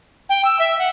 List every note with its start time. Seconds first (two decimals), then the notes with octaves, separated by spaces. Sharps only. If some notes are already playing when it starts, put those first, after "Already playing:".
0.29 G5
0.45 E6
0.59 E5
0.79 F#5